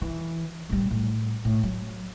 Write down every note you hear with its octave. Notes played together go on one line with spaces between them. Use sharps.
E3
A1 G3
A2
A2
F#3